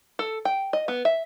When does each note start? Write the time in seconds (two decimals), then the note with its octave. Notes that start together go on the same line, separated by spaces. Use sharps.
0.19 A4
0.45 G5
0.73 D#5
0.88 B3
1.05 E5